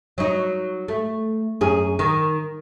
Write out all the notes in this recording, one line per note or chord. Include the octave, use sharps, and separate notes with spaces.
F#3 D#4
A3
F#2 G#4
D#3